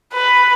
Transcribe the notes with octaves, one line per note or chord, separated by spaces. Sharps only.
B4